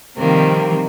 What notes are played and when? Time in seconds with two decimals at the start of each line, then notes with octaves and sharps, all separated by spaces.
0.17 C3 D#3 F3 G3 A#3 C4